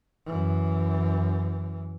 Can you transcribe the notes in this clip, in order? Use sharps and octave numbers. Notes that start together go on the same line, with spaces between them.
F#2 E3